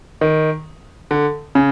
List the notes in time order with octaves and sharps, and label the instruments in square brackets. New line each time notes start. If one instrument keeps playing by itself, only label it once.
[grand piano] D#3
D3
C#3